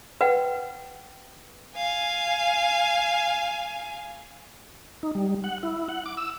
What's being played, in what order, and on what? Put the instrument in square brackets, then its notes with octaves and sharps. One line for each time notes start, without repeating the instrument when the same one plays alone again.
[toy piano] B4 F#5 G5
[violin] F5 G#5
[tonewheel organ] D#4
G3
F#5
E4
F#5
D6
E6